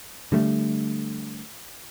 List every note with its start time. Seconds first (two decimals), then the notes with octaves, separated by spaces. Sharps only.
0.32 D3 G3 A3